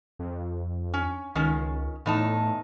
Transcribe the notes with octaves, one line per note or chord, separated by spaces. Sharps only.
F2
C#4
C#2 D#3 C#4
E2 A2 D#4 A5